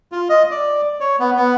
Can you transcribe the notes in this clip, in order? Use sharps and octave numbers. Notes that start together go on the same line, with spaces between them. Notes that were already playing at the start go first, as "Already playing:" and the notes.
F4
D#5
D5
C#5
B3
B3